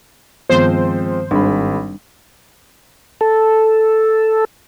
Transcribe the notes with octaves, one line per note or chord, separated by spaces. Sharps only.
G2 D#3 F3 G#3 B3 C4 C5
G#1 G3 D4 G#4 B5
A4